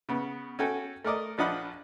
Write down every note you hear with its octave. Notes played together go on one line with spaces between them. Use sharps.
C#3 B3
C#4 F#4 A4 G5 G#5
A3 A#4 D5 D#5
A#1 F3 D4 D#5 F#5 B5